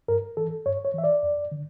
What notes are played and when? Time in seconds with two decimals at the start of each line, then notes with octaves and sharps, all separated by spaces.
0.08 G2 A#4
0.37 E3 A4
0.65 G2 C#5
0.85 C#5
0.94 E3 E5
1.04 D5
1.23 F2
1.52 D3